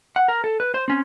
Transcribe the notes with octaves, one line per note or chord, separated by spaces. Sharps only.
F#5
A#4
A4
B4
C5
C4 C#4